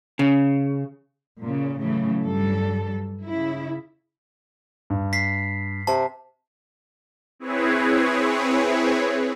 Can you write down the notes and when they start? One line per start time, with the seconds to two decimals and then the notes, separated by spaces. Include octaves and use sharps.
0.19 C#3
1.42 A#2 C#3
1.79 A2 C#3 E3 F#3 A3
2.21 G2 F#3 G3 A4
3.25 C#3 E4
4.90 G2
5.13 B6 C7
5.87 C3 A5
7.39 C4 E4 G#4 B4 C#5